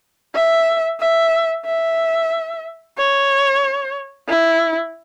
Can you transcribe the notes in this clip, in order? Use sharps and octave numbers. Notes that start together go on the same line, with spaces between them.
E5
E5
E5
C#5
E4